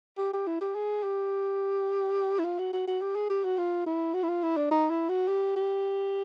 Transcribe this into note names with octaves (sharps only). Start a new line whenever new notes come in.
G4
G4
E4
G4
G#4
G4
E4
F4
F#4
F#4
F#4
G4
G#4
G4
F#4
F4
E4
F#4
E4
F4
E4
D4
D#4
E4
F#4
G4
G4